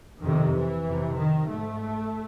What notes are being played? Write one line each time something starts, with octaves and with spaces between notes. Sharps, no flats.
F2 C3 D#3
E3
F2 C3
D#3
G#2 A3